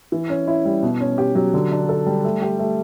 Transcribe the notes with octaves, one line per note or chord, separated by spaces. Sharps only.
E3
C#4
E4
G3
B2
C#4
G4
F#3
D3
D4
A4
G3
A3
G4
A3